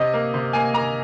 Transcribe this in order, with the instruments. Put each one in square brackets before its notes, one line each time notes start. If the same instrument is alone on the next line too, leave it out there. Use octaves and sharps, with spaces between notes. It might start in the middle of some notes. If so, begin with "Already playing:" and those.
Already playing: [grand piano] C3 D#5
A#3
C3
A#3 G#5
A#3 A#5